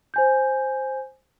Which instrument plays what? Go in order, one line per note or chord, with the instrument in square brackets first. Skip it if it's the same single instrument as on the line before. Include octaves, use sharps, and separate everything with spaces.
[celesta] C5 G#5 G6